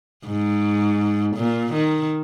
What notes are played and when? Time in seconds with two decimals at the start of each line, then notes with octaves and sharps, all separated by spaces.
0.26 G#2
1.36 A#2
1.73 D#3